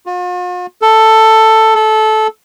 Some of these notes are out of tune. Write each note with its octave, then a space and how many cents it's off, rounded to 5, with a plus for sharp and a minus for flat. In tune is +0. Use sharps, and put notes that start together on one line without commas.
F4 +45
A4 +10
A4 -15